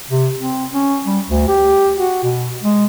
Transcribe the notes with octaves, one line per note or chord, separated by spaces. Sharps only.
C3
C4
C#4
G3
D2
G4
F#4
B2
G#3